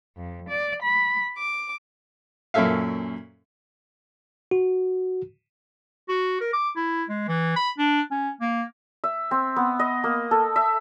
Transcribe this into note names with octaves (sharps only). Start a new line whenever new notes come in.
F2
D5
B5
D6
F#2 A#2 C#4 A4 E5 F5
F#4
F#4
A#4
D6
E4
G#3
E3
B5
D4
C#4
A#3
E5
C4
B3
D#5
A#3
A4
E5